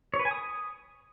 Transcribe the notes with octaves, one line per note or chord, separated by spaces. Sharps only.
C#5
B4
G#5
D#6